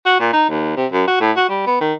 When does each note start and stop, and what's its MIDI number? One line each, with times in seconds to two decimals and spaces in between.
0.06 0.15 66
0.20 0.33 46
0.33 0.44 63
0.49 0.75 39
0.76 0.86 48
0.92 1.06 42
1.07 1.18 66
1.21 1.31 45
1.36 1.46 66
1.49 1.63 55
1.66 1.80 59
1.81 1.93 51